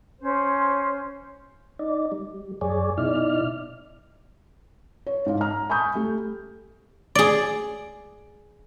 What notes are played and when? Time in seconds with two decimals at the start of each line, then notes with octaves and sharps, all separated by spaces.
0.20 C#4 C5
1.79 D#4 D5
2.12 G3
2.61 F#2 G#4 C#5 D5
2.98 B2 D#4 E4 D5 F6
5.07 C#5
5.26 G#2 F5
5.41 A#5 F6
5.70 G#5 B5 C#6 D#6 G6
5.95 A3 G4
7.15 G#4 D5